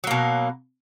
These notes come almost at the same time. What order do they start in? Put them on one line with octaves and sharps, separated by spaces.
F#3 A#3 B2